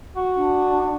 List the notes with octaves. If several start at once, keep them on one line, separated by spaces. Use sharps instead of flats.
F#4
D4